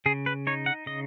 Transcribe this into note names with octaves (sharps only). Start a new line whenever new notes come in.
C#3 G#4
B4
D#4 C#5
F#5
C#3 D#5